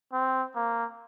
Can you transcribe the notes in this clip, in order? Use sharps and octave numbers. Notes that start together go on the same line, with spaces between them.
C4
A#3